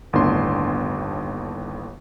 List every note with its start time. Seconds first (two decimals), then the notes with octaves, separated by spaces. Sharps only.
0.13 G1 D#2 A2 B3 D4 C6